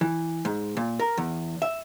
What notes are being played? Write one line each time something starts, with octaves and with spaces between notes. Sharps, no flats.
E3
G#2
A#2
A#4
E2
E5